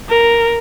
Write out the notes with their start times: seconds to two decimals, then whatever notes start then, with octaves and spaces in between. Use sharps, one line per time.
0.09 A#4